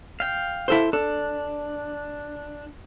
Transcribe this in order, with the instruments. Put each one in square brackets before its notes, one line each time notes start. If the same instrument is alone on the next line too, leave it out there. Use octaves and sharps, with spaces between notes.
[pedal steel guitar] F5 G5
[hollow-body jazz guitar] E4 A4 C5
[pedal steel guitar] D4 [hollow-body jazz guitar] A4